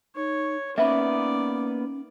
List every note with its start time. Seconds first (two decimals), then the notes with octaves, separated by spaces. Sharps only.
0.15 D#4 C#5
0.78 A#3 B3 C#4 D#4 B4 D5 E5